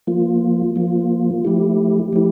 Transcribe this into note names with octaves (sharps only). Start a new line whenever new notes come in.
F3 A#3 F4
F3 A#3 F4
F3 A3 E4 G4
F3 A3 E4 G4